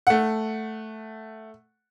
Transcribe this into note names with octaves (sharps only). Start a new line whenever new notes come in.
A3 F#5